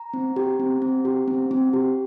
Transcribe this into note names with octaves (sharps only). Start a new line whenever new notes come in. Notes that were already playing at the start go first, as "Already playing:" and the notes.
Already playing: A#5
C4
G4
C4
C4
G4
C4
C4
G4